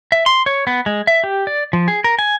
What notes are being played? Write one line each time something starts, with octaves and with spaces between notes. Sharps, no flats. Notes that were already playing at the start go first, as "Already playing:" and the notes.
E5
C6
C#5
B3
G#3
E5
G4
D5
F3
G#4
A#4
G#5